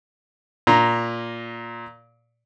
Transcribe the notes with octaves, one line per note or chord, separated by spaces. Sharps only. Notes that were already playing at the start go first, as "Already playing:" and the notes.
A#2 A#5